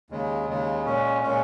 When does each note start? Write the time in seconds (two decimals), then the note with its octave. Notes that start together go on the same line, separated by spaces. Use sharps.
0.10 D#2 C#3 G#3
0.48 D#2 C#3 G#3
0.85 A#2 G#3 C#4
1.23 A#2 G#3 C#4